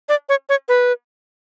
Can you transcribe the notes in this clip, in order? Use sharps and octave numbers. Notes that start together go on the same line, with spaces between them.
D5
C#5
C#5
B4